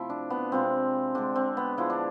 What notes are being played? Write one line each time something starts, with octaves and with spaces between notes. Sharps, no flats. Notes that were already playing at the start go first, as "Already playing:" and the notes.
Already playing: C3 F3 A3 E4
D4
B3
C3 F3 G#3 C4
D3 G#3 D4
C4
B3
D3 F3 G#3 E4
D4